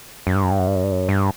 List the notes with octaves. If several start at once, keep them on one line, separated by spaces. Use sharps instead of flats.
F#2
G2
F#2
G2
F#2
G2
F#2
G2
F#2
G2